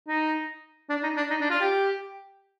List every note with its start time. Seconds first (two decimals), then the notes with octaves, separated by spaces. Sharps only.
0.08 D#4
0.89 D4
1.03 D#4
1.17 D4
1.30 D#4
1.40 D4
1.51 F4
1.61 G4